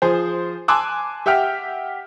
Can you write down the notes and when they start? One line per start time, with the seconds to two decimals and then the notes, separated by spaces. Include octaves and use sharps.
0.02 F3 G#4 C5
0.68 G#5 A5 C6 D6 E6 F#6
1.26 G4 E5 F#5 G5 F6